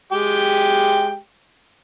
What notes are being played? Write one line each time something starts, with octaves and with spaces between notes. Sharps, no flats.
G#3 G4 G5